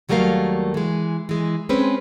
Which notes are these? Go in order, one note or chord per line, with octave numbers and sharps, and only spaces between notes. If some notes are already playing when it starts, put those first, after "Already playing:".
D#2 F#3 G3 A3 A#4 F5
E3 G#3
E3 G#3
G#3 C4 C#4 B4